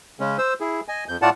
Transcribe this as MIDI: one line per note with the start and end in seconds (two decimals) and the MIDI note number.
0.20 0.37 49
0.20 0.37 56
0.20 0.37 61
0.38 0.54 72
0.38 0.54 88
0.60 0.80 64
0.60 0.80 68
0.88 1.04 75
0.88 1.04 80
1.09 1.17 41
1.09 1.17 91
1.22 1.30 45
1.22 1.30 57
1.22 1.30 65
1.22 1.30 74
1.22 1.30 78
1.22 1.30 81